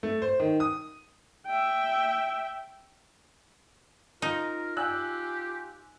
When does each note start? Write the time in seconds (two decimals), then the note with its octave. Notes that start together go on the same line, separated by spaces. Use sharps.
0.03 A3
0.22 C5
0.40 D#3
0.60 D#6
1.47 E5 G5
4.22 D#4 F4 A#4
4.77 G4 G#5 E6 F#6